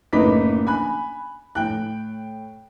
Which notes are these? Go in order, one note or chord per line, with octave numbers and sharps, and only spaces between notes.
F#1 A2 D#4 B4 D6 B6
G#5 B5 F#6
A2 G5 F#6